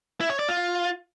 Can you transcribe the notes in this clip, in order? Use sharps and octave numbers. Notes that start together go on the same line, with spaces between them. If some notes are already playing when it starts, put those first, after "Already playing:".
E4
C#5
D5
F4